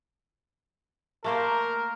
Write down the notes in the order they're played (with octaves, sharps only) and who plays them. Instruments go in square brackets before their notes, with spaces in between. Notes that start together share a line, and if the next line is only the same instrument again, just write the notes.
[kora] A3 A#3 C5 [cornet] A#4